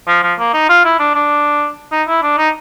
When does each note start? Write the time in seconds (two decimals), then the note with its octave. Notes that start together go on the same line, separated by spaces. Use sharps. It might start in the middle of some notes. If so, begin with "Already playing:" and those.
0.08 F3
0.23 F3
0.39 A#3
0.54 D#4
0.69 F4
0.85 E4
0.99 D4
1.15 D4
1.92 D#4
2.08 E4
2.23 D4
2.38 D#4